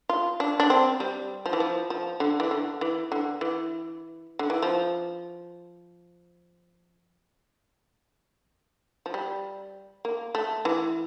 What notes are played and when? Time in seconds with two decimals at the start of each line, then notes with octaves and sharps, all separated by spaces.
0.09 F4
0.40 D4
0.60 D4
0.70 C4
1.00 G3
1.46 F3
1.53 E3
1.60 F3
1.90 F3
2.20 D3
2.40 E3
2.51 D3
2.81 E3
3.12 D3
3.41 E3
4.39 D3
4.50 E3
4.63 F3
9.06 F3
9.14 G3
10.05 A#3
10.35 A3
10.65 E3